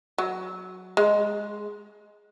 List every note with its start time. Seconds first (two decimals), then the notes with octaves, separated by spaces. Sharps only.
0.18 F#3
0.97 G#3